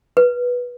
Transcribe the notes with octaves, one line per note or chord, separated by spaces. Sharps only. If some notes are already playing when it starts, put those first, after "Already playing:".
B4